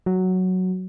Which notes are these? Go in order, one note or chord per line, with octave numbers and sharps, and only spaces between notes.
F#3